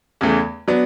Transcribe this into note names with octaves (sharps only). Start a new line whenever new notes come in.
E2 C#3 E3 A3
F#3 B3 D4